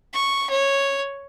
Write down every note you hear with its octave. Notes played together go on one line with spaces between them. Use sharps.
C#6
C#5